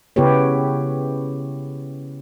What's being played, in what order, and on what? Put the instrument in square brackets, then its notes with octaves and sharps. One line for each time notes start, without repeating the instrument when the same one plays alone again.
[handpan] C#3 B3 E4 G4 B4 C#5